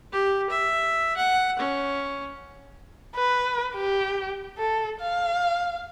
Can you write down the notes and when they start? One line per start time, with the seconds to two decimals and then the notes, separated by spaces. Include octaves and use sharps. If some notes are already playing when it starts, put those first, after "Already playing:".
0.12 G4
0.50 E5
1.16 F#5
1.59 C#4
3.15 B4
3.74 G4
4.58 A4
5.00 F5